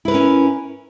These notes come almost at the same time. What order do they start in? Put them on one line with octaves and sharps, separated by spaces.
E4 B4 A#4 C#4